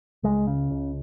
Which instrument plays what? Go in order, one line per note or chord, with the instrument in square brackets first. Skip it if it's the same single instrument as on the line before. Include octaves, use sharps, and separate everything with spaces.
[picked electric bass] C#2 G#3
C#3
C#2